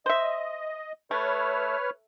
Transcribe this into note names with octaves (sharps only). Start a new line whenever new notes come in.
C5 D#5 E5
A3 B4 C#5 F6